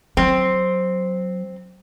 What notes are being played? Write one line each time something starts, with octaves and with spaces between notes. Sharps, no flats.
F#3 C4